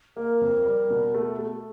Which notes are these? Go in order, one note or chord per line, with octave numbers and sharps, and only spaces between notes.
A#3 A#4
F2
G3
B2
A3
A3